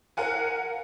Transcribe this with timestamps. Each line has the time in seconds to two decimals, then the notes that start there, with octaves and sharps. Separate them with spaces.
0.17 A#4 F5 F#5 G#5